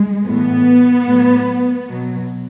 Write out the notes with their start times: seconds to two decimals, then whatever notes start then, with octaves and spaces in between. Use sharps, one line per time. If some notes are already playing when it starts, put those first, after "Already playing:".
Already playing: G#3
0.25 A2 E3 B3
1.06 A2 F#3
1.88 B2 F#3